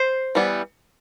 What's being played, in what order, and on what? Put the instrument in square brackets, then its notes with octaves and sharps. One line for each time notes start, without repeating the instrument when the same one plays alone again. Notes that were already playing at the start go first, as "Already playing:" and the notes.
Already playing: [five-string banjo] C5
E3 G3 B3